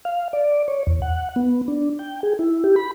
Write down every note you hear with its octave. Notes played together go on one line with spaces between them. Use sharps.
F5
D5
C#5
E2
F#5
B3
D4
G5
G#4
E4
G4
B5